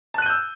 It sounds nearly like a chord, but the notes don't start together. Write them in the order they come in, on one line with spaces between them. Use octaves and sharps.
A5 F#6 D#7 G6 E6